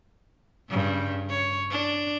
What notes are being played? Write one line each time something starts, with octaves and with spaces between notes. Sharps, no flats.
G2 C#3
C#5
D4